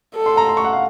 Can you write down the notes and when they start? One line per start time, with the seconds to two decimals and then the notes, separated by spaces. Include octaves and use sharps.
0.15 A4
0.26 C6
0.37 A#5
0.49 C6
0.57 C#6
0.65 F#5
0.73 F5